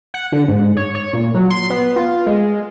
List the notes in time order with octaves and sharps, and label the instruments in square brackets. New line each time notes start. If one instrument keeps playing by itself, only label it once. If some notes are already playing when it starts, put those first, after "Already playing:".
[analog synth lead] F#5
D3
G#2
C#5
C#5
A#2
F#3
C6
B3
F4
G#3